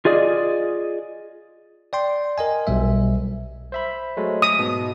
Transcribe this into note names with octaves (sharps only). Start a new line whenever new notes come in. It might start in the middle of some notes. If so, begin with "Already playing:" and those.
F4 G#4 D5 D#5
D5 G5 C6
A#4 D#5 G#5
B1 B2 G3 E5
C5 E5 B5
F#3 G#3 A3
D#6
G#2 B2